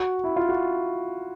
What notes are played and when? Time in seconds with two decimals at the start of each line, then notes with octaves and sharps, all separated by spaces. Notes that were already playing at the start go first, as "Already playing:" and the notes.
Already playing: F#4
0.24 E4
0.36 F4
0.49 F#4